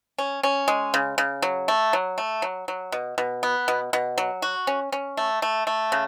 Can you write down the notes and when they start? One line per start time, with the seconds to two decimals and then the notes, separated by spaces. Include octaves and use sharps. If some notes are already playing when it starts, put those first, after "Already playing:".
0.18 C#4
0.43 C#4
0.68 G#3
0.94 C#3
1.18 C#3
1.42 F#3
1.68 A3
1.93 F#3
2.18 A3
2.42 F#3
2.68 F#3
2.92 B2
3.18 B2
3.43 B3
3.68 B2
3.93 B2
4.18 F#3
4.42 F#4
4.67 C#4
4.92 C#4
5.17 A3
5.42 A3
5.67 A3
5.92 C#3